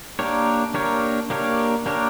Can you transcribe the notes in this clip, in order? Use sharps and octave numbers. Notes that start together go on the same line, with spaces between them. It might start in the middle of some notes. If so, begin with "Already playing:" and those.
A#3 D4 G4 A#4 C#5
A#3 D4 G4 A#4 C#5
A#3 D4 G4 A#4 C#5
A#3 D4 G4 A#4 C#5